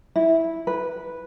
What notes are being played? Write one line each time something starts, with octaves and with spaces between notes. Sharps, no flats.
E4
B4